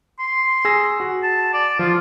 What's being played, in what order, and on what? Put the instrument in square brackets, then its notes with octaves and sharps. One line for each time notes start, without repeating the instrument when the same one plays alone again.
[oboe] C6
[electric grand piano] G#4 E6 A#6
F#4
[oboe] A5
D5
[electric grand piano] F3 [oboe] F4